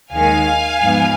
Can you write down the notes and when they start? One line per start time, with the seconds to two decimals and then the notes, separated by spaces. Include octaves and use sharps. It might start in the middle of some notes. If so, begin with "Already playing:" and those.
0.12 D#2 D#3 G#3 F5 G#5
0.80 G#2 F3 B3